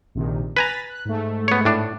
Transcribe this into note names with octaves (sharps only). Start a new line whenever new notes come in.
A#1 C3 D#3
B4 G#5 A#5 A6 B6
F#6
G#2 A3
B3 C#5
A2 D4